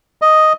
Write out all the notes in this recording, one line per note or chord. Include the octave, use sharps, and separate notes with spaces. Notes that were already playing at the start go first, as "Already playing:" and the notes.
D#5